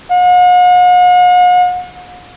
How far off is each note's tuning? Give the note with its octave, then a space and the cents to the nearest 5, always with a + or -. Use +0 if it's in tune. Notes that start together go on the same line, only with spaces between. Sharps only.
F#5 -45